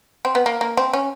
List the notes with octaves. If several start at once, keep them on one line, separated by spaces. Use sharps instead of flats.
C4
B3
A#3
A#3
C4
C#4